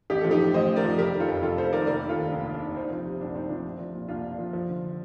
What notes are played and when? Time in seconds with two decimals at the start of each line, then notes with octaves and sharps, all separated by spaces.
0.10 A1 G4
0.21 F3 A4
0.31 D#4 G4
0.40 A2
0.54 A1 C5 D#5
0.70 A1
0.76 A#4 D5
0.84 F3
0.98 F1 G4 A#4
1.13 D#3
1.20 F4 A4
1.28 F2
1.43 F1 F4 A4
1.57 F1 A4 C5
1.72 D#3 A#4 D5
1.87 F1 A#4 D5
2.02 D#3
2.09 F4 A4
2.17 D#2
2.31 F1 D4
2.46 F1
2.54 D4
2.61 D#3
2.76 C2 C4 D#4
2.91 F3
3.05 C3
3.21 C2 D4
3.35 C2 C4 D#4
3.50 F3 D4
3.65 C2
3.79 F3
3.94 A#2
4.09 C2 D4 F4
4.24 C2
4.38 F3
4.53 F3
4.68 D3